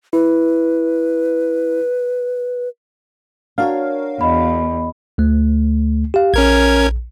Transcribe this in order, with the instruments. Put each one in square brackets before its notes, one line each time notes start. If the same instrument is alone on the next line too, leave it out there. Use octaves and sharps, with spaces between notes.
[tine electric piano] E4 [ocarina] B4
[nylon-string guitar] D4 C#5 [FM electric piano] F#4 A#4 F5
[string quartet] E2 [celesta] D#5 B5
[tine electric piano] D2 A3
G4 F5
[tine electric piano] A#1 [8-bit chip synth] C#4 A#4 G#6